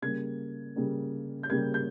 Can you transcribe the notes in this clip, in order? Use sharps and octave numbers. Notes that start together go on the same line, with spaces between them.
C#3 G3 A#3 G#6
C#3 G3 A#3
G6
C#3 G3 A#3 G#6
G6